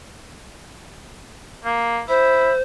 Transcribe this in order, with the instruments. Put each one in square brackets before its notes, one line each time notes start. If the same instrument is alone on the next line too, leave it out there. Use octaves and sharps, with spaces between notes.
[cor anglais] A#3
[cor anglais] E4 [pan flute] C5